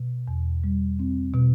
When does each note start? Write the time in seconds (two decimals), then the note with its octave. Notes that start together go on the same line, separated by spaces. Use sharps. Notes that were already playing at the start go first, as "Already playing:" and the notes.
Already playing: B2
0.28 E2
0.64 G3
0.99 C4
1.34 B2